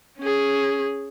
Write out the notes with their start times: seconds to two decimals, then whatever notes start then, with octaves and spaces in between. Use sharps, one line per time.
0.19 C#4 G#4